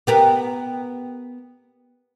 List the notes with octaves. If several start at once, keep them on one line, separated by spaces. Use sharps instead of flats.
B3 G4 A#4